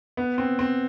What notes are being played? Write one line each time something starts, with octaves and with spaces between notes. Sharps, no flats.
B3
C4
C4